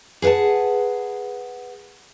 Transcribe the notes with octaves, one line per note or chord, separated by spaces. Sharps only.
G#4 B4 F5 F#5 A5